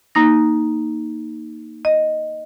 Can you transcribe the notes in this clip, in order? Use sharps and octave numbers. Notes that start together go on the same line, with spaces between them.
A#3 D#4 A#6
D#5